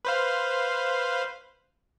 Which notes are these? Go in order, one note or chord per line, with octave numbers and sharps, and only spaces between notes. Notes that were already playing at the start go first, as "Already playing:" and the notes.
B4 C5 F5